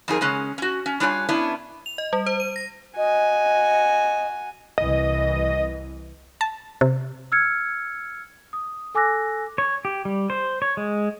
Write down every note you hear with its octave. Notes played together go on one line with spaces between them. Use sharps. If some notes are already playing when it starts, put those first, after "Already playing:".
F2 D#4 G#4 A#4
C#3 G#3 C#4
C#4 F#4
C#4
G3 D4 F4 C#5 G#5
B3 C#4 D4 E4
F7
D#5
G3
C5
D#7
A#6
F#4 D#5 G#5
C2 E3 D#5
A5
C3
E6 F6 G#6 C#7
D#6
A4 G#5 D6 E6 F#6 A#6
C#5
G4
G3
C5
C#5
G#3